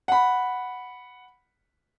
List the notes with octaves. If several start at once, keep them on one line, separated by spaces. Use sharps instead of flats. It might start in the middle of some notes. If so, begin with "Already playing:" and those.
F#5 B5